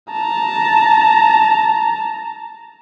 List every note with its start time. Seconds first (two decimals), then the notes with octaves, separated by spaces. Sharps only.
0.11 A5 A#5